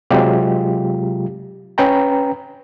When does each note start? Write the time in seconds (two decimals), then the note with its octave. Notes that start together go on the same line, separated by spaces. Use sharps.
0.11 C3 F#3 G#3 F4 G4
1.78 C#4 B4 G5 A#5